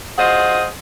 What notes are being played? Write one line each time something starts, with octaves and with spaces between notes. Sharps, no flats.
F4 F#4 G#4 C5 D#5